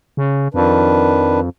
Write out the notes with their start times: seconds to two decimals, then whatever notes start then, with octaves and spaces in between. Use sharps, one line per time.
0.17 C#3
0.54 F2 D#3 D4 B4